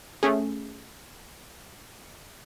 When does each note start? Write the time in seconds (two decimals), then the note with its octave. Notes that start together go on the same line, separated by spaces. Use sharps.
0.23 A3 C#4 G#4